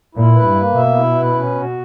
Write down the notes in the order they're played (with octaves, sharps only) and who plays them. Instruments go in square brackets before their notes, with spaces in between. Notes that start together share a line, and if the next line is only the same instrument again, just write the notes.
[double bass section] A#2 [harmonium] E4
[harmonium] B4
[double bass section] G2
[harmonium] A#3
[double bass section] B2 [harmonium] E5
[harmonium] E4
B4
C#4
F#4